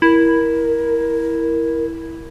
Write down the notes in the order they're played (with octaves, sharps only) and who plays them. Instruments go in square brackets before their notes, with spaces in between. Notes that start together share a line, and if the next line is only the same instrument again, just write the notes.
[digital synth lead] E4 [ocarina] A#4